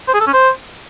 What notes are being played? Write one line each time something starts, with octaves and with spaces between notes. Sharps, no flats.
C5
G#4
A4
C#4
C5